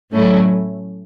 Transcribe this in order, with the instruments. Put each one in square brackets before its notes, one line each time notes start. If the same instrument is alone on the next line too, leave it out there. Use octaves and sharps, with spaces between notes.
[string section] A2 F#3 A3 C#4 E4